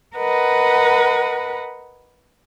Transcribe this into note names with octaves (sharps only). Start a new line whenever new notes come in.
A#4 B4 D#5 F#5